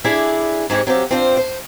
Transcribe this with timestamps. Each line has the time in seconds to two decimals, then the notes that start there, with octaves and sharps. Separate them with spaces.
0.04 D4 E4 G#4 A4 D5 E5
0.70 G#2 G#3 C4 G4 C#5
0.87 F#3 C4 F4 G4
1.11 C4 D4 F4 C5
1.37 C5